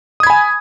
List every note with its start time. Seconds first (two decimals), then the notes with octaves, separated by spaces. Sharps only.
0.20 D#6
0.23 G#6
0.27 B5
0.30 G#5